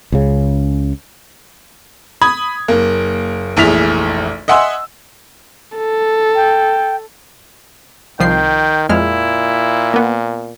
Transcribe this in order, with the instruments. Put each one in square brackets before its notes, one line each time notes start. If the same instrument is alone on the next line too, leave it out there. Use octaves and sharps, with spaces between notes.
[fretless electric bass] C#2 C#3
[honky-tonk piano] B5 D#6 G#6
F#1 A#3
F1 A#1 E3 G#4 B6 F7
D#5 E5 F#5 G#5 C6 E6
[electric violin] A4
[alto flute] G5
[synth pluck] C2 F3 C7 [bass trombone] D#3 [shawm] G5
[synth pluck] F2 G#3 F6 [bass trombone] A#2 [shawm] E4
[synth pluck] A#3 B3